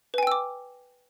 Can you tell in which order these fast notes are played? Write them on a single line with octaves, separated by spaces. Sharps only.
B4 G#5 G5 E6 D6